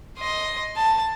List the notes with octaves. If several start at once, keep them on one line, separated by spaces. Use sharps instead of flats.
D#5 C6
A5